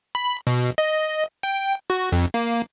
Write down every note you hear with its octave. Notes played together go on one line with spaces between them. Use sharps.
B5
B2
D#5
G5
F#4
F2
A#3